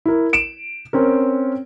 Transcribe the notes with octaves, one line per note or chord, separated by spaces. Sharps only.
E4 A#4
D7 E7
C4 C#4 A#4